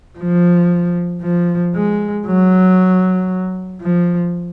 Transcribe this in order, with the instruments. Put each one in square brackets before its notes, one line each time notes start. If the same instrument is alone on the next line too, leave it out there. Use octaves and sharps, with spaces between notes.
[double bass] F3
F3
G#3
F#3
F3